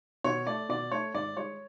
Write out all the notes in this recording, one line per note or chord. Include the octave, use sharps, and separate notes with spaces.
B2 C#5
A3 D5
B2 D5
A3 C#5
G#2 D5
G#3 C#5